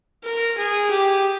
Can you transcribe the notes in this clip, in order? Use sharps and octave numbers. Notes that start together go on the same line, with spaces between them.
A#4
G#4
G4